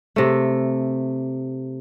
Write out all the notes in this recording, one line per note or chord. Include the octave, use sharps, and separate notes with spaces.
C3 A3